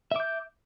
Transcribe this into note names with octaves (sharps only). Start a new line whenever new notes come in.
E5 D6 G6